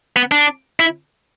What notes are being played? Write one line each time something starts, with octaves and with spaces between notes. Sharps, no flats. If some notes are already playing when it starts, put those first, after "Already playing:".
B3
D4
E4